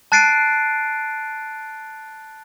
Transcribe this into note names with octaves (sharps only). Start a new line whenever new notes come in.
A5 F#6 A6 C7 D7 D#7